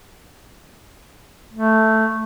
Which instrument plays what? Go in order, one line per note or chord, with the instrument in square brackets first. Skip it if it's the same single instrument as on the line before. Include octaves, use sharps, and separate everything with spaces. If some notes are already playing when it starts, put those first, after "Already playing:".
[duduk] A3